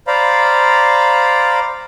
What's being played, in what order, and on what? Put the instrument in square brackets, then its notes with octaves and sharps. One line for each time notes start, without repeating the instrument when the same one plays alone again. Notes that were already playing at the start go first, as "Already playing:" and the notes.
[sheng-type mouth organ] C5 D5 F5 A#5 B5